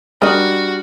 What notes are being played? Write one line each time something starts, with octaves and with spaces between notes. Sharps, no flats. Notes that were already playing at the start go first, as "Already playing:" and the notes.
G3 D4 F#4 A#4 D#5 F6